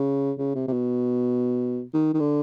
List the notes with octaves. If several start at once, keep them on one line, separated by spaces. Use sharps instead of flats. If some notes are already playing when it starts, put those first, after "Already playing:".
Already playing: C#3
C#3
C3
C3
B2
D#3
D#3
D3